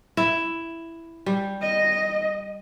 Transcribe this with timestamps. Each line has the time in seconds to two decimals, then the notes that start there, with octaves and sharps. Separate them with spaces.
0.17 E4
1.26 G3
1.61 D#5